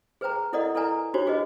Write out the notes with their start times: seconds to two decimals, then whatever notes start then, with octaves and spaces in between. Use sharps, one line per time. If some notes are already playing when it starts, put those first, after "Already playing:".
0.21 G#4 B4 C5 G5 A#5
0.53 E4 A4 A#4 D5 D#5 F#5
0.75 E4 A4 B4 D5 G#5 A#5
1.14 D4 D#4 F#4 G4 C5 C#5
1.27 F#4 G#4 B4 C5 D#5